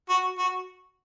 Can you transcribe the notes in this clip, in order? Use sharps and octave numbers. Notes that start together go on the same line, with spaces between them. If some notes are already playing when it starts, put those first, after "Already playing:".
F#4
F#4